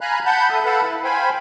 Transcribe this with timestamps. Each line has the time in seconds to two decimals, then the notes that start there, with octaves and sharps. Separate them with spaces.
0.01 F5 G#5 A#5 B5 F#6
0.26 F#5 A5 B5 G6
0.50 A4 E5 D#6
0.65 A4 B4 F5 F#5 A5 B5
0.82 E4
1.04 C5 F5 G5 G#5 B5